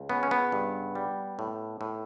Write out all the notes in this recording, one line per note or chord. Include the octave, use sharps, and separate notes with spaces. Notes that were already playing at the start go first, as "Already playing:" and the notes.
Already playing: C#2
C#3 B3
C#4
B3
G2
G3
A2
A2